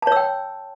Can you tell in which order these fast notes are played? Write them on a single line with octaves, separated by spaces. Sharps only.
A5 C#5 E6 G5